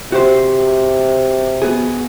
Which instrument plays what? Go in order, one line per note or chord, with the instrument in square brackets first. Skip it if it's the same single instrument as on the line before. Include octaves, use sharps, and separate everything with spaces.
[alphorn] C3 [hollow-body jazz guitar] F#4 G4 C5
[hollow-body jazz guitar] B3 F#4 G#4